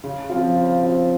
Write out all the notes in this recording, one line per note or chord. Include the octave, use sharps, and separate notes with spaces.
C#3
F3 C4 F4
C#3
F3 C4 F4